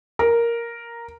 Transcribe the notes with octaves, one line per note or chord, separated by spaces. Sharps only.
A#4